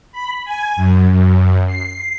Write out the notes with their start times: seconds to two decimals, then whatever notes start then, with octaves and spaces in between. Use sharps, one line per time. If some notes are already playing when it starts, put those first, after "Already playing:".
0.12 B5
0.45 G#5
0.76 F#2
1.12 F#2
1.67 C7